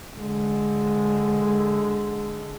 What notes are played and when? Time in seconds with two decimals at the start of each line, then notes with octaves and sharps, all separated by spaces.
0.16 D3 G#3